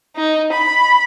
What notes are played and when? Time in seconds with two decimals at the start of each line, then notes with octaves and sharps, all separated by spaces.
0.16 D#4
0.52 B5